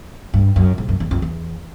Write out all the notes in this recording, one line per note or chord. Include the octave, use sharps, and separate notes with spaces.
G2
F#2
G#2
F#2
E2
F2
E2